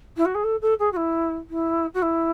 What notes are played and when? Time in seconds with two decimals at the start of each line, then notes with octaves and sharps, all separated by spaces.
0.17 E4
0.25 F#4
0.35 G#4
0.44 A4
0.62 A4
0.79 G#4
0.92 F#4
0.97 E4
1.50 E4
1.94 F#4
2.02 E4